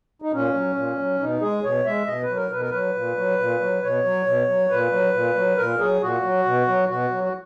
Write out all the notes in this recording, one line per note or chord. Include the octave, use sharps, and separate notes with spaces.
D#4
A#2 C#4
F#3
A#2
F#3
B2 D#4
G#3 G#4
B2 C#5
G#3 E5
B2 D#5
B4
F#3
A#4
B2 B4
A#4
F#3 B4
A#2
F#3
A#2
F#3
B2 C#5
F#3
B2
F#3
A#2 B4
F#3
A#2
F#3
A#2 A#4
F#3 G#4
A#2 F#4
F#3
B2
F#3
B2 F#4
F#3
F#4